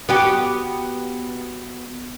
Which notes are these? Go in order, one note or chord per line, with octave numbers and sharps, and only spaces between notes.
B3 F#4 G4